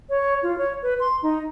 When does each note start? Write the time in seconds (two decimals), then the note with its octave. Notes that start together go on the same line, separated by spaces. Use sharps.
0.10 C#5
0.43 F4
0.58 C#5
0.83 B4
1.00 C6
1.23 D#4